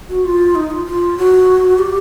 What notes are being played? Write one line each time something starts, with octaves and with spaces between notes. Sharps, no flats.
F#4
F4
D#4
F4
F4
F#4
G4